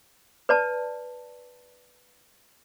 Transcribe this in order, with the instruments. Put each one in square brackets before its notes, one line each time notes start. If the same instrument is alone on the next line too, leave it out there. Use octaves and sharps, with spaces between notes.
[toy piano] B4 D5 A5